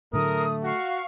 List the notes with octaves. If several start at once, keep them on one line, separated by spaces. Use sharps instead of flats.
A2 D3 F#3 A3 A#4 D#6
F#4 F5 C#6